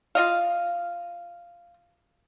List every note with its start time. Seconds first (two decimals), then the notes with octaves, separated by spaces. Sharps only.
0.15 F4 D#5 F5